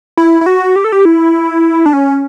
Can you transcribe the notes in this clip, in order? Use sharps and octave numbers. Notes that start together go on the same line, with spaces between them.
E4
E4
F#4
G4
A4
G4
E4
D4
C#4